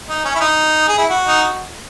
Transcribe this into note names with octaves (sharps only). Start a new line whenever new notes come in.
D#4
C#4
E4
D#4
G#4
E4
F#4
D#4